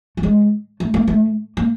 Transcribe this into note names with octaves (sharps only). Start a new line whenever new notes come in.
A3
G#3
A3
A#3
A3
A#3